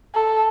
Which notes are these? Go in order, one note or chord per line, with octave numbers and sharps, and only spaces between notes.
A4